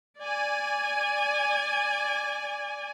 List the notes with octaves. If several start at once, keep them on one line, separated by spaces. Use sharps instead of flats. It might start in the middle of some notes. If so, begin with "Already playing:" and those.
D5 G#5